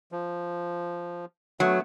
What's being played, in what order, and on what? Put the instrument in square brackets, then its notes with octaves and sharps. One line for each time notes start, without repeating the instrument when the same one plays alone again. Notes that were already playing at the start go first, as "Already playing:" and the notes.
[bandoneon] F3
[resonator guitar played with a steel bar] F#3 [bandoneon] A3 B3